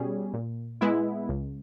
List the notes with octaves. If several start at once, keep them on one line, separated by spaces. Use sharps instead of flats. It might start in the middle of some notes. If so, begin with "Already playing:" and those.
Already playing: B2 G3 C#4 G#4
A#2
G#3 B3 E4
C#2